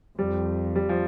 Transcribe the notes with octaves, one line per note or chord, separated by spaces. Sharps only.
F2 G3
G3
F3